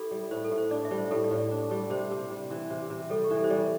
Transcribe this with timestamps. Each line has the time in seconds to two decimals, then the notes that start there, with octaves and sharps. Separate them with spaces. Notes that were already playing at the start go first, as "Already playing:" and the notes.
Already playing: E4 G4 A4
0.11 G3
0.31 A2 C5
0.44 A4
0.51 A2
0.58 C5
0.71 D4 D5
0.85 E5
0.91 G3
0.98 C5
1.11 A2 A4
1.24 D5
1.31 A2
1.38 D5
1.51 D4
1.71 G3
1.90 C3 C5
2.11 C3
2.31 G3
2.51 E3
2.70 C3
2.90 C3
3.10 G3 A4
3.24 G4
3.30 E3
3.37 A4
3.44 C5
3.50 G3 D5